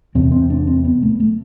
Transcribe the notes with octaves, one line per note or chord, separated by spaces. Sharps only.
E2 C3 C4
C4
D4
C4
B3
A3
A3